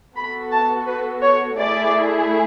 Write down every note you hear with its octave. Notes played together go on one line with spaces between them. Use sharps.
B3 F#4 A4 B5
A5
B4
C#5
A3 E4 G#4 D5